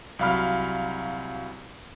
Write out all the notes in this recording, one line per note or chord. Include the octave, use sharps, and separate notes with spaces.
C2 F#3 F5 B5 F6